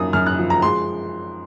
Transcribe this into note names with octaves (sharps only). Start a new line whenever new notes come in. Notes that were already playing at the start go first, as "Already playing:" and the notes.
Already playing: F#2 F3 A#3 D#6
F#2 F6
F#6
F3
A#5
G#3 C6